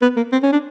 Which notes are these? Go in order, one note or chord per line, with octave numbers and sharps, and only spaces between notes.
B3
A#3
C4
C#4
D4